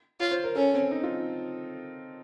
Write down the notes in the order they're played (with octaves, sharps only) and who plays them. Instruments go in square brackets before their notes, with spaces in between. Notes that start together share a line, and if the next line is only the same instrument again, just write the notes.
[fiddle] F4 [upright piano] C#5
[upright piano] C5
A#4
[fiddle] C#4 [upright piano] A4
[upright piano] C4
D#4
F4